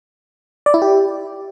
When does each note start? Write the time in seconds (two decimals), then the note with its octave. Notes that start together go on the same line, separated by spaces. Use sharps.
0.66 D5
0.74 E4
0.82 G4